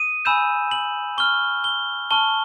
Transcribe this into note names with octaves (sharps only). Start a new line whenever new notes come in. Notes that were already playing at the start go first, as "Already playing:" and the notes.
Already playing: D#6 D#7
G#5 B5 E6 G6 E7
F#7
C#6 F6 G7
G7
A5 C#6 F6 G7